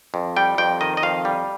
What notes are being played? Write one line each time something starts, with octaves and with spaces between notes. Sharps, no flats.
F2
G3 G5
F2 G5
D#3 D#5
D#5
F2 F5
G3